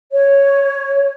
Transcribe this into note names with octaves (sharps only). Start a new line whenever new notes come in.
C#5